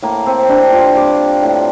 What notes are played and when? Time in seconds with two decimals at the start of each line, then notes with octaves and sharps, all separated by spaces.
0.03 A2 A#3
0.26 C4
0.49 G3 D4
0.73 F4
0.96 G3 D5
1.43 A2